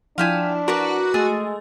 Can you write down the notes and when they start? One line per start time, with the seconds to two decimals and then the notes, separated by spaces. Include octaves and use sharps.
0.18 F3 D4 E4 F5 G5 G#5
0.68 F#4 A#4 B4 D5
1.14 G#3 A3 G#4